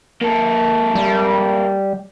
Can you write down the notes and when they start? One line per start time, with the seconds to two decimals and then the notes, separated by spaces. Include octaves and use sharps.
0.22 A#3 A4
0.95 G3